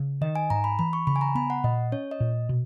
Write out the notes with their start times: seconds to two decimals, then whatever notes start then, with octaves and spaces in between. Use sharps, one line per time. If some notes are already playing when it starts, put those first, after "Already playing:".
Already playing: C#3
0.21 D#3 D#5
0.36 G#5
0.50 G#2 A#5
0.64 B5
0.79 E3 B5
0.93 C#6
1.07 C#3 B5
1.16 G#5
1.21 A#5
1.35 B3 B5
1.50 F#5
1.64 A#2 D#5
1.92 C#4 C#5
2.11 D#5
2.20 A#2
2.49 B2